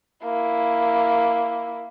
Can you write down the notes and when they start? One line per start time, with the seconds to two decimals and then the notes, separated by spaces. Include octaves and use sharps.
0.23 A#3 E4